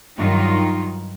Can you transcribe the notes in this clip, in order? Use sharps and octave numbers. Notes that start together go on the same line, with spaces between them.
G2 D#3 F#3 D#4 F4